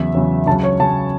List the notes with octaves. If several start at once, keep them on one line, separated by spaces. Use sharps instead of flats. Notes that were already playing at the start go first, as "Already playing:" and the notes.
Already playing: E2 C#3 F#3 E5
E2 C#3 F#3
C#2 C#3 F#3 A5
C#5
C#2 C#3 F#3 A5